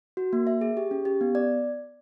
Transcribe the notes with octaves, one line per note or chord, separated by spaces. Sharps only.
F#4
A#3
E5
G#4
G4
C#4
G4
B3
D5